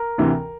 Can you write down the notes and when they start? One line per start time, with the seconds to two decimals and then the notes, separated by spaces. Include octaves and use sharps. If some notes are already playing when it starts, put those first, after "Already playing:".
Already playing: A#4
0.18 D2 C3 E3